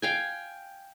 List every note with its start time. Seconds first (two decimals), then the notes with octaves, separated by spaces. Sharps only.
0.02 F5 G5 G#5